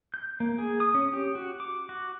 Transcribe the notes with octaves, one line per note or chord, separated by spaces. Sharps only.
G6
A#3
G#4
D#6
C#4
G4
F#4
D6
F#4